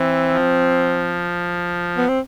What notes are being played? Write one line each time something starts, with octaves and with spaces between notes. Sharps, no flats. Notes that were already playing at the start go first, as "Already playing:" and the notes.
Already playing: E3 C4
F3
B3
C4